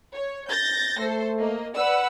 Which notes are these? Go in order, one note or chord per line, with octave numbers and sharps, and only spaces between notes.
C#5
G6 A6 A#6
A3 A4 C5
A#3 D#5
B4 D5 F#5 E6